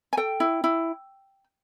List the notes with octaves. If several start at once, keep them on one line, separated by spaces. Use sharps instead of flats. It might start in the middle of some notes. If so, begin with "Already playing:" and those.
G#5
A4 G5
E4
E4